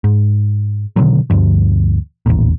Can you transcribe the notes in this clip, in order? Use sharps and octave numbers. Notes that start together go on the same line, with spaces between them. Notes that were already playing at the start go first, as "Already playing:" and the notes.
G#2
B2 D3 D#3 F#3
D2 G2 F3
D#1 A1 E2 A#2